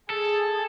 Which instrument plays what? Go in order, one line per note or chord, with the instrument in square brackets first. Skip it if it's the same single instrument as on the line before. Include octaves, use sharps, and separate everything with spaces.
[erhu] G#4 [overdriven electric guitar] A4